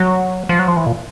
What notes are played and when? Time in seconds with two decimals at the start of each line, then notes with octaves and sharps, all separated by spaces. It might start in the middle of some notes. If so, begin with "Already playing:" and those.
Already playing: F#3
0.49 F3
0.59 F#3
0.68 F3
0.77 E3
0.86 A#2